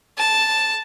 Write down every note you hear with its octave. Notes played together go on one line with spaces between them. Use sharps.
A5